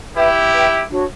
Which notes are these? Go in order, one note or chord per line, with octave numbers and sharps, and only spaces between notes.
E4 G4 B4 E5 G5
B4 E5 G5
D4 F#4 C#5